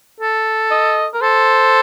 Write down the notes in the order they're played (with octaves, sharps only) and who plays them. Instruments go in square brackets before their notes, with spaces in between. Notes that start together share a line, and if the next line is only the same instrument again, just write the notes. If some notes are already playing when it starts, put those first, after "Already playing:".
[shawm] A4
[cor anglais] D#5
A#4
[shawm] A4 [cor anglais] C5